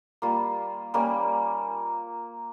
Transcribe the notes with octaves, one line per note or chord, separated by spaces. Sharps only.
G3 A#3 F4
G3 A#3 C#4